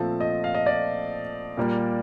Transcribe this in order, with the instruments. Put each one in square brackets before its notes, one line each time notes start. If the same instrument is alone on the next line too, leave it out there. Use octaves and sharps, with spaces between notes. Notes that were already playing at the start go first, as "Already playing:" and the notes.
Already playing: [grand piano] A#2 F3 A3 C4 A5
D#5
F5
D#5
D5
A#2 G3 A#3